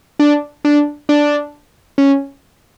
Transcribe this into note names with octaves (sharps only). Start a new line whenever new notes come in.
D4
D4
D4
C#4